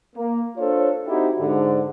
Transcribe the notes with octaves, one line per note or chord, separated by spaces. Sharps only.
A#3
D4 F4 A4 C5 C#5
C4 D#4 E4 F#4 G4
G#2 D3